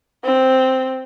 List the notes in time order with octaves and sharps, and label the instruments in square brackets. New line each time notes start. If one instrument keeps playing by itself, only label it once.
[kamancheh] C4